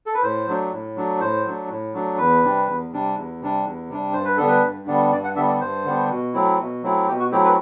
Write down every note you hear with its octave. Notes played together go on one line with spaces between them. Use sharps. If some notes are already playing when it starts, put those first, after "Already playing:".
A4
B4
A2 C5
F#3 A3 D4
A2
F#3 A3 D4
A2 C5
F#3 A3 D4
A2
F#3 A3 D4
E2 B4
C3 G3 D4
E2
C3 G3 D4
E2
C3 G3 D4
E2
C3 G3 D4
G2 C5
B4
D3 G3 B3 D4 A4
B4
G2
D3 G3 B3 D4
G2 D5
F#5
D3 G3 B3 D4 E5
D5
G2 C5
D3 G3 B3 D4
B2
F#3 A3 C4 E4
B2
F#3 A3 C4 E4
B2 G4
F#4
F#3 A3 C4 E4 G4
B4